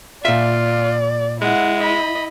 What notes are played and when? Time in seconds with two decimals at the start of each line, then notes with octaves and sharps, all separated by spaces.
0.25 A#2 F4 D5 E5
1.42 G#3 E4 F#5
1.80 D#5 B5